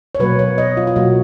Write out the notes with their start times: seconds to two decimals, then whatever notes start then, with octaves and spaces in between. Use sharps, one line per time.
0.15 C#5
0.19 B2 F#3 A#3 B4
0.39 C#5
0.58 D#5
0.77 F4
0.87 F4
0.96 B2 F#3 A#3 F#4